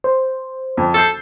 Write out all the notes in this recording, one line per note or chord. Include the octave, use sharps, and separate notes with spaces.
C5
F2
A4 E6 G6 C7